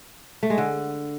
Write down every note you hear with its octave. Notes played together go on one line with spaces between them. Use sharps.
A3
G#3
D3